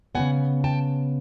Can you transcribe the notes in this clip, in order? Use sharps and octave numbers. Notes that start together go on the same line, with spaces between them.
C#3 F#3 B3 F#5 G#5
G5 A5